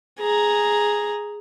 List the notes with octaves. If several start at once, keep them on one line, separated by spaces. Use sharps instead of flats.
G#4 A#5